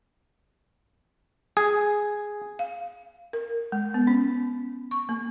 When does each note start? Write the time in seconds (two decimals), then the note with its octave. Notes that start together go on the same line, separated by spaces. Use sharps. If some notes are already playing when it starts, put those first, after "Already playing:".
1.57 G#4
2.59 F5
3.33 A#4
3.72 G#3
3.94 B3
4.07 C#4
4.91 C#6
5.09 A#3